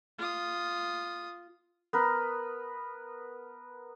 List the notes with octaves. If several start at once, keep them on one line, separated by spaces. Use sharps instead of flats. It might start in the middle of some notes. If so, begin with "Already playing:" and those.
F4 D#6
B3 A#4 B4